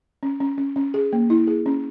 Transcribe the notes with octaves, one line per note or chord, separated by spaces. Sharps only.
C#4
C#4
C#4
C#4
G#4
A#3
E4
G#4
C#4